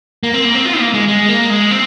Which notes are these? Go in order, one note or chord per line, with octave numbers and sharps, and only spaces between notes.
A#3
C4
A#3
C4
F4
A#3
G#3
G#3
A#3
G#3
C4